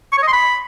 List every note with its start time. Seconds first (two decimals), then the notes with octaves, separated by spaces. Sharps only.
0.12 C#6
0.17 C#5
0.23 D#5
0.28 C6
0.33 B5